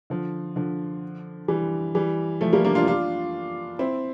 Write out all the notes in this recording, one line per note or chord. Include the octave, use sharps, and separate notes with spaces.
D3 F3
D3 F3
E3 G3
E3 G3
F3 A3
G3 A#3
A#3 D4
D4 F4
D4 F4
C4 E4